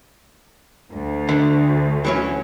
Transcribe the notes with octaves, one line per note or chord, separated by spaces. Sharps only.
D2
D3
E3 F#3 C#4